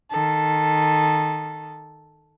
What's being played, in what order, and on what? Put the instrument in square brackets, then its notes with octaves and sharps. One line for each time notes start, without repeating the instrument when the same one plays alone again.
[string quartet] D#3 A4